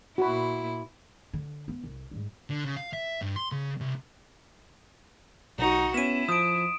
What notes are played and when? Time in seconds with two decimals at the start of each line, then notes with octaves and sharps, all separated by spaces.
0.18 A#2 E4 F#4 B5
1.33 D3
1.68 B3
1.84 C2
2.11 G#2 G3
2.50 D3
2.65 C#3
2.77 F5
2.93 E5
3.21 G2
3.36 C6
3.52 C#3
3.81 C2
5.59 B1 D#4 F#4
5.94 B3 C#4 E4 D#7 E7
6.29 F3 D#6 D7